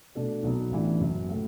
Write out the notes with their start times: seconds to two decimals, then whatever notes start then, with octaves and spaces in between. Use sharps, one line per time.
0.15 B2 A3 D4 A4
0.43 B1 B2 F#3 B3
0.71 A1 A2 E3 D4
1.00 F#1 F#2 F#3
1.29 A2 A3 F#4